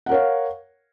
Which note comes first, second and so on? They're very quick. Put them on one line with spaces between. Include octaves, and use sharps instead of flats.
F#5 A#4 C#5 F5